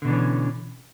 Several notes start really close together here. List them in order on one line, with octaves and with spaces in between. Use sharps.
D3 B2 D4 E3 C#4